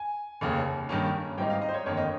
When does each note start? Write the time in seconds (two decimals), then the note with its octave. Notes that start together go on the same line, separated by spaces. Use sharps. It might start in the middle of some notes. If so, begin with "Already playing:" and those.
Already playing: G#5
0.41 F1 D#2 C#3
0.89 G2 D#3 A#3 C#4
1.38 G#2 G3 C4 D#4 G5
1.50 F5
1.62 D#5
1.69 C5
1.74 C#5
1.86 G1 F2 D#3 A#3 C#5
1.97 D#5